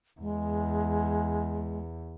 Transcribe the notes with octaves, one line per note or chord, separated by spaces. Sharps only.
E2 G#3